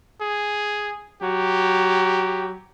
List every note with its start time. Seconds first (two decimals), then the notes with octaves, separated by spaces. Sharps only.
0.21 G#4
1.22 F#3 G4